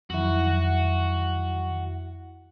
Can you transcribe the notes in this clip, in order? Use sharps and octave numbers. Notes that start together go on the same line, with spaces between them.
F2 D#3 F#3 E4 F#4